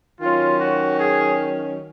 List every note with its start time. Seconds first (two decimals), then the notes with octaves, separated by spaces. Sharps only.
0.21 D#3 F#3 C#4 F4
0.60 F#4
1.00 G#4